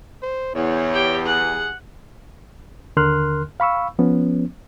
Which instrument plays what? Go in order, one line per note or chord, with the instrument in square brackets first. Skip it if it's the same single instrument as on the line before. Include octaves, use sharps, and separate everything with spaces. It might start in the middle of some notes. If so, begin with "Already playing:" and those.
[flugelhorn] C5
[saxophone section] E2 [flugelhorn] C#5
[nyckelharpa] G4 G5
[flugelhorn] G#4 [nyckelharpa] F#5
[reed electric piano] D#2 D3 A#4 C6 F6 F#6
F5 B5 C#6 E6
F3 B3 C#4